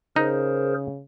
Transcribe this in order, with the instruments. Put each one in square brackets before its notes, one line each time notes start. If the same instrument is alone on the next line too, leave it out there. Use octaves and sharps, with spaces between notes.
[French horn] C#3 [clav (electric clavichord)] D#4 [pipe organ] G#4 A#4 C5